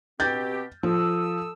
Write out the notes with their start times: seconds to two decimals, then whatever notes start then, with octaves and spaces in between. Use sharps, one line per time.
0.20 B2 C4 G4 G6 A6
0.83 F3 A4 D#6 E6